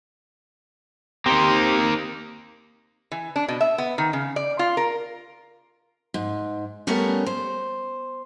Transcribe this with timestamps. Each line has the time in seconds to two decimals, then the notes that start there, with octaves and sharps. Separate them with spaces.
1.26 A#3 C4 D#4 G4 C5
3.12 E3
3.36 D4
3.48 B2
3.61 E5
3.78 B3
3.98 D#3
4.13 C#3
4.36 D5
4.59 F4
4.77 A#4
6.14 G#2
6.87 G3 A3 B3 C#4 A#4 C#5
7.26 C5